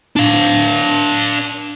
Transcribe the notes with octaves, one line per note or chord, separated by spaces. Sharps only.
D4 F5